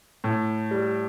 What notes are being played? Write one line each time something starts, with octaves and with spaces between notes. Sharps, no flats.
A2
G3